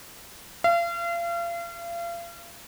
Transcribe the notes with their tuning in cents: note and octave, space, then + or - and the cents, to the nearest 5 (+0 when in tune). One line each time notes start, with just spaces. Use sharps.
F5 -40